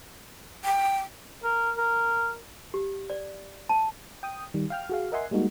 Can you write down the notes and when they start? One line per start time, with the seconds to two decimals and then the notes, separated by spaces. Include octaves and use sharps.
0.65 G5
1.44 A#4
1.77 A#4
2.74 G4
3.10 D5
3.69 A5
4.23 G5 D#6
4.54 D#3 G3
4.70 F5 G5 F6
4.89 F#4 G#4 F5
5.12 A#4 D#5 E5 F#5 G#5 C6
5.31 G3 G#3 A#3 D#4 F#4